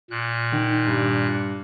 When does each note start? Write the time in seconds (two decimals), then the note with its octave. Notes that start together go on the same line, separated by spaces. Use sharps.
0.10 A#2 F#6
0.52 D#3
0.87 G2